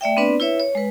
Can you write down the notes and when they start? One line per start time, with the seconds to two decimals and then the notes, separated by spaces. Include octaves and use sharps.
0.01 A3 D5 E5 G5
0.17 B3 C4 D4 B4 D5
0.40 E4 B4 C#5 E5
0.60 C#5
0.75 G#3 B4